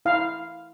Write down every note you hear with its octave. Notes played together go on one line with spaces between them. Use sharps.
E4 F5